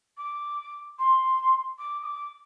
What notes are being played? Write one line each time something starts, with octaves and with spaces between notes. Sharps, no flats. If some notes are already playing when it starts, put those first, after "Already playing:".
D6
C6
D6
D#6
D6